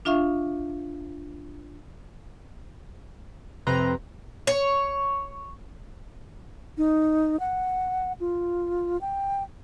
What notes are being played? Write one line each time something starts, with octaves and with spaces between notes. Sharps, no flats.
D4 F4 E5 F5 C#6
F2 C3 B4 A#5 C6
C#5
D#4
F#5
F4
G5